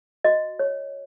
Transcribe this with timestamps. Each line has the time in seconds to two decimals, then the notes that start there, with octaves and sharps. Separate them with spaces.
0.24 F#4 D#5
0.59 C#5